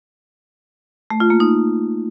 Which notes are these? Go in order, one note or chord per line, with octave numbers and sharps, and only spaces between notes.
A3
F4
A#3
D#4